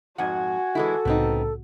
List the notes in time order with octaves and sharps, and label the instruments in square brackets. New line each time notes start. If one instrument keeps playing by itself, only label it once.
[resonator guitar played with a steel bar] F2 G#2 [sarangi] F#4 [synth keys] F#5 G#5 G#6
[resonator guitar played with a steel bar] E3 G#3 E4 [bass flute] A4
[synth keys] C2 A2 C#3 [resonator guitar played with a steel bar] B3 C4 D#4